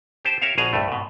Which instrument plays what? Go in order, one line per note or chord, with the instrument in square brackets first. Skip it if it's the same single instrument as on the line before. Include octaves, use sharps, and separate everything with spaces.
[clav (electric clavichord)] G4 C5 A5
G4 A#4 C#5 E5 F5
A#1 B2 G#4 F5 G#5 A#5
C2 G2 A3
G#2 B2